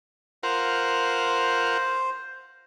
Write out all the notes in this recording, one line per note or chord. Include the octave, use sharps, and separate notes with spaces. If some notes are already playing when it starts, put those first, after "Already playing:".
F4 A#4 C5 F#5